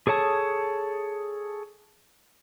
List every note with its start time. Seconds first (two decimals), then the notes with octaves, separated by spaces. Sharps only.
0.07 G#4 A4 C#5 A5 D#6